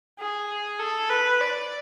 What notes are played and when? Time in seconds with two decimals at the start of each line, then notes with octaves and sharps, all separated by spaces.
0.19 G#4
0.79 A4
1.09 B4
1.41 D5